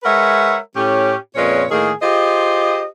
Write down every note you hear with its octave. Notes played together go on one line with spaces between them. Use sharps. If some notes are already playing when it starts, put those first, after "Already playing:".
G#3 A#4 B4 C#5 E5 F#5
A2 C#4 G4
F2 A#2 G#3 C#4 B4 C#5
A2 D#3 A#3 G#4
F4 G4 G#4 C5 D#5